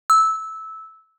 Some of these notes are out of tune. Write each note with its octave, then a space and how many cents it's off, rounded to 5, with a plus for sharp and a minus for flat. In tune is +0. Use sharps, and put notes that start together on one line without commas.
E6 -15